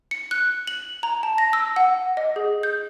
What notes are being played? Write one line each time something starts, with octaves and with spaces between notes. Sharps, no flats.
C#7
F#6
F#7
A#5
A5
A#6
E6
F#5
D#5
G#4
G6